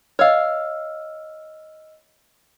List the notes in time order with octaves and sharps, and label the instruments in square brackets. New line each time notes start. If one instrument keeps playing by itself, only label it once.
[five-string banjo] C#5 F5 [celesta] D#5 E6 F6